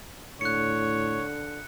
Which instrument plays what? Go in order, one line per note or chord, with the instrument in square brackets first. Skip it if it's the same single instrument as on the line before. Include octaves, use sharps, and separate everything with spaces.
[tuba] A2 [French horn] D3 [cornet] C#5 [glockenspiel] F#6 C#7